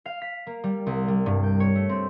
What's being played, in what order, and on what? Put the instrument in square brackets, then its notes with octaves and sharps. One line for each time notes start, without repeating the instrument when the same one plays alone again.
[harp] F5
B6
A#3
G3
C2
G3
G2
G5
C#5
A3
C4